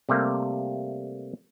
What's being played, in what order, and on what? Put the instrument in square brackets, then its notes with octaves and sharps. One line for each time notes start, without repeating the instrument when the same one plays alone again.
[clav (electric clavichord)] C3 G3 A3 A#3